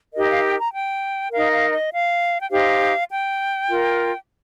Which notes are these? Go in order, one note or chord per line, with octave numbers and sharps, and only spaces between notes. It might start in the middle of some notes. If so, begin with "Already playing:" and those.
D#4 G4 A#4 D#5
F5
G5
A#5
G5
D#4 A#4 F5
F5
D#5
F5
G5
D#4 G4 C5 F5
G5
F4 A#4